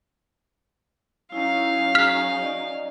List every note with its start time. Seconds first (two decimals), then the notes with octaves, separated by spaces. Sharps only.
1.32 F#3 C#4 D#4 E4 F5
1.95 G#4 F6 B6
2.42 D5 D#5